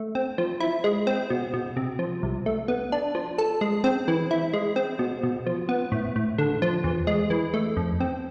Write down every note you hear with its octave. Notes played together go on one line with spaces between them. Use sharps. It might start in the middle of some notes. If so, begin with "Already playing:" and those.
Already playing: A3
C4
F3
E4
G#3
C4
B2
B2
C3
F3
C2
A3
B3
D4
F3
A4
G#3
C4
E3
E4
G#3
C4
B2
B2
F3
B3
A2
A2
D3
F3
E2
G#3
E3
A3
F2
C4